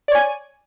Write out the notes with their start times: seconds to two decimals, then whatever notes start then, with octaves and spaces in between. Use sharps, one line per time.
0.08 D5
0.12 C#5
0.15 G#5